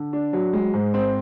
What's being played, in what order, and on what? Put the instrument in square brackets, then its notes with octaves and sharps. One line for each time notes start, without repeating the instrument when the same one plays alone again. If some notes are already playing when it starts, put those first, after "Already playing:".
Already playing: [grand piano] D3
D4
F#3
G#3
G#2
C4